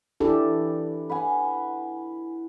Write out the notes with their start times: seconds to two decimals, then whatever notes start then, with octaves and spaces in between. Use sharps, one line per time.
0.20 E3 D4 G4 A4
1.09 B4 F#5 G#5